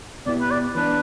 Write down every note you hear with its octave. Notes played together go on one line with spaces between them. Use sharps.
B2 B3 E4 G4 D5
B4
D5
E3 B3 D4 B4